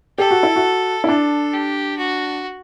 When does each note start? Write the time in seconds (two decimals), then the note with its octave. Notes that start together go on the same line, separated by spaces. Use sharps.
0.18 G4 A4
0.31 F#4
0.43 E4
0.56 F#4
1.04 E4
1.08 D4 A4
1.54 G4
1.98 F#4